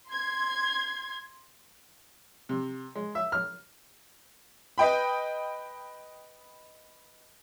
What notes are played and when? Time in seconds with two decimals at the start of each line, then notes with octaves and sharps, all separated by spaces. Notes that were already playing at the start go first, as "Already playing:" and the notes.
0.11 C6 G#6
2.49 C3
2.95 G#3
3.15 E5
3.32 F6
4.78 B4 D#5 G5 B5